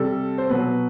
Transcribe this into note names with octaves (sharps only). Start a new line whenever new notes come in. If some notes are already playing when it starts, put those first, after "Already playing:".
Already playing: C3 G3 A4
C5
B2 F#3 B4